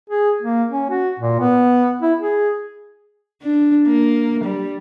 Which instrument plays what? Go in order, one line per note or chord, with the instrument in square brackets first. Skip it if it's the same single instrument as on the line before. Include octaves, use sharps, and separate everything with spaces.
[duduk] G#4
A#3
C#4
F#4
A#2
B3
E4
G#4
[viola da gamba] D4
A#3
G3